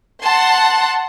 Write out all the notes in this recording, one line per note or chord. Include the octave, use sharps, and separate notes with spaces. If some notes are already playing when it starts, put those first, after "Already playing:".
F#5 A5 C6